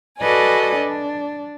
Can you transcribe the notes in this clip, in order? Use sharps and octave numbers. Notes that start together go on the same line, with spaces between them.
F#4 A4 B4 D5 D#5 G#5
D4